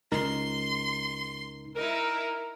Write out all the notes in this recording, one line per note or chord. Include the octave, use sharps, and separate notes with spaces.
C#2 D#4 A#4 C6
D#4 E4 A#4